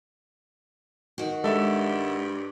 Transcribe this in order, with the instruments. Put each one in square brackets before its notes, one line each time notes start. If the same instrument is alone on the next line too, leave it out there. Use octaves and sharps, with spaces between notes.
[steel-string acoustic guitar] D#3 F#4
[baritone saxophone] G2 [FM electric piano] G#3 [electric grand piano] A4 E5